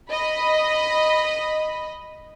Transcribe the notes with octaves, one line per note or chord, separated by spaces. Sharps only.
D#5 B5